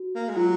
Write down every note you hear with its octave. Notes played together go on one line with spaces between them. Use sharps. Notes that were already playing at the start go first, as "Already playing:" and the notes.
Already playing: F#4
A#3
G#3
F#3 F4